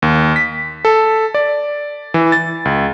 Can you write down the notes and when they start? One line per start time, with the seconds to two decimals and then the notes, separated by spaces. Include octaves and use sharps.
0.02 D#2
0.36 B6
0.85 A4
1.34 D5
2.14 E3
2.32 A6
2.65 C#2